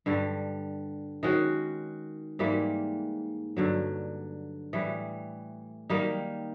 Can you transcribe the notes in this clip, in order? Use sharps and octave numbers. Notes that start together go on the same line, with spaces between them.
G2 D3 G3
D#3 G#3 C#4 F#4
G#2 E3 G3 A#3
G2 D3 F#3
A2 E3 G3
D#3 G3 A#3 D#4